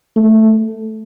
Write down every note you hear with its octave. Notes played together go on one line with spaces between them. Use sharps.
A3